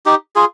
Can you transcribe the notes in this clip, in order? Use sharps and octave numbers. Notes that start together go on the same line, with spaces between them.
D#4 G4
F4 G#4